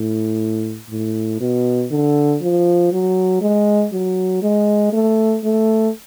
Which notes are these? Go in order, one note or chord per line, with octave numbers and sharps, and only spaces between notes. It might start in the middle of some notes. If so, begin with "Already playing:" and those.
Already playing: A2
A2
B2
D3
F3
F#3
G#3
F#3
G#3
A3
A3